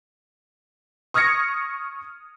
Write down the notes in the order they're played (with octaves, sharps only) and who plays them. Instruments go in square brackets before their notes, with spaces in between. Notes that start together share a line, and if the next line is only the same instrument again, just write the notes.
[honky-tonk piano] C#6 D#6 F6 G#6 A#6 C#7